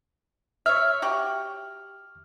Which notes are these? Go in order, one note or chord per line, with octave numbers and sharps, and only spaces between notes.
C#5 E5 F6
F#4 G4